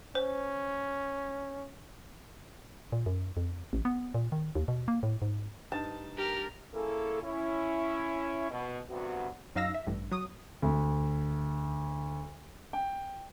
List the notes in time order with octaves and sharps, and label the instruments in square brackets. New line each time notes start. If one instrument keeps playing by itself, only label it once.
[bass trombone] C#4 [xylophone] C5
[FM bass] A#2
F#2
F2
A1
B3
A#2
D#3
D#2
B2
A#3
A2
G#2
[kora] G2 D#4 F5 [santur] A5
[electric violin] G4 F6 [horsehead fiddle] A#4
[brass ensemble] A#3 C#4 E4 G#4 A4
C#4 E4
B2
D2 G2 C3 B3 F#4
[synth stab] F#2 D#4 F5 E6 A#6
E5
A1 G2
F#3 D#6
[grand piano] D2
G5